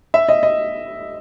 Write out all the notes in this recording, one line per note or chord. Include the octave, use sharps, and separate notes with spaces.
E5
D#5
D#5